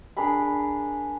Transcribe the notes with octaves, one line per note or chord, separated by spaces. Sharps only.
D4 G#4 A#4 B5